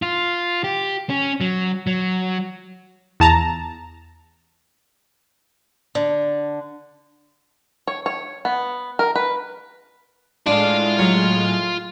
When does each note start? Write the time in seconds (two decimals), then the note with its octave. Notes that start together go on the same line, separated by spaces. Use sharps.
0.02 F4
0.64 G4
1.10 C#4
1.41 F#3
1.87 F#3
3.20 E2 A5 A#5
5.95 D3
7.87 C#5
8.06 C#5
8.45 B3
8.99 A#4
9.15 B4
10.46 A2 G#3 D4 F4 F5 F6
10.99 F#3